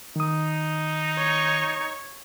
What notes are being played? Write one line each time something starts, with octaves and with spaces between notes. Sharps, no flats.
D#3 D#4 D#6
C#5